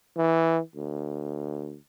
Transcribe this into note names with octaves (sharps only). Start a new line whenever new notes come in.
E3
D2